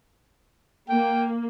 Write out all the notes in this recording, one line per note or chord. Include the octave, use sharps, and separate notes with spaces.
A#3 G5